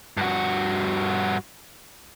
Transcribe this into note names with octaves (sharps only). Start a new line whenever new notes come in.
G2 F#4